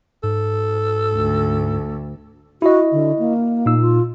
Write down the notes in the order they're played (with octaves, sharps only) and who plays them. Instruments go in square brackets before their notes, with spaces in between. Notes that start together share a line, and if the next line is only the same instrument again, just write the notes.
[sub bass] G#2 [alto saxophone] A4
[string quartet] D2
[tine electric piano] E4 D#5 [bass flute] F#4
[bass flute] D3
A#3
[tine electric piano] A#2 D#4 E6
[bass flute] F4